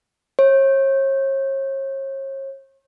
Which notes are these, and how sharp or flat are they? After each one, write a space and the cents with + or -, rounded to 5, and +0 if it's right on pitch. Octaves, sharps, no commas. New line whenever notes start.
C#5 -40